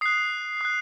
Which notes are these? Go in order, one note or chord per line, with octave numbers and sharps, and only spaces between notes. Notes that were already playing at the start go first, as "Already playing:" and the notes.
D#6 F#6 C7
D#6 F#6